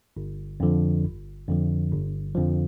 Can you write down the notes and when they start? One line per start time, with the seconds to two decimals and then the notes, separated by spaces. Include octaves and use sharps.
0.17 G1
0.60 F2 D3 F3
1.04 G1
1.48 F2 D3 F3
1.91 G1
2.35 F2 D3 F3